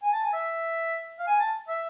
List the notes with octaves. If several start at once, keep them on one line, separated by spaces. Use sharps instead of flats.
G#5
A5
G#5
E5
F5
G#5
A5
E5